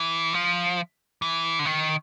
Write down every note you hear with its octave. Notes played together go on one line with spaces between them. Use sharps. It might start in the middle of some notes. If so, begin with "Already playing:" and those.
Already playing: E3
F3
E3
D3
D#3